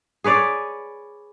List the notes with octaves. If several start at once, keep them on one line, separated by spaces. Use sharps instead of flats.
G#4 B4 C#5 D5